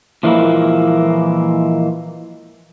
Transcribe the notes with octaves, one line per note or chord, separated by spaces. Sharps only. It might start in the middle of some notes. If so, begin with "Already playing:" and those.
A#2 E3 F3 G#3 A#3 E4